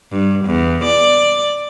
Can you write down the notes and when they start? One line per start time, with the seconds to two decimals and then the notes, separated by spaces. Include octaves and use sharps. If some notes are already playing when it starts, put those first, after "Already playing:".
0.11 G2
0.46 E2
0.85 D5